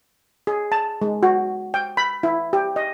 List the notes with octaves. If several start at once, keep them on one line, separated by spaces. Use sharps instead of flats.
G#4
A5
G#3
F#4
G5
B5
E4
G4
D#5